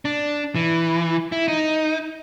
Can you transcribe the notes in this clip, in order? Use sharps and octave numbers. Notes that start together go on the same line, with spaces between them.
D4
E3
E4
D#4